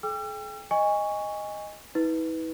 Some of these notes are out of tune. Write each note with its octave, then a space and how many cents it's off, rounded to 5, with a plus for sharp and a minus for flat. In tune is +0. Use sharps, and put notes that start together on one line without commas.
G#4 +45 G5 +30 E6 +45
D#5 +0 G#5 -20 C#6 +10
E4 -45 B4 +0